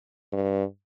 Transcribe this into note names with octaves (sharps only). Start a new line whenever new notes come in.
G2